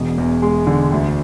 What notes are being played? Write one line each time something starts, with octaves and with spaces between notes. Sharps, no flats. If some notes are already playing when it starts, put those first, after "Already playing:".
Already playing: E1 B2
E2
G#3
D3
D2